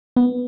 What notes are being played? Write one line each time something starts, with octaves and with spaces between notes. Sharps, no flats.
B3